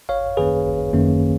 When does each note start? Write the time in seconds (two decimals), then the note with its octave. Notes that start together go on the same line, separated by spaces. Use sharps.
0.09 G#1 C#5 F5
0.37 F#2 D#3 A#3 C#4 G#4 B4
0.66 G#1
0.93 F#2 D#3 A#3 C#4